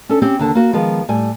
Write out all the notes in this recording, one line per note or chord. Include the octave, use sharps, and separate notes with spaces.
C#4 D4 A4
C4 C#4 G4
D#2 D3 A5
A#3 F#4
D#3 F3 G#3 B3
A2 G3 G#5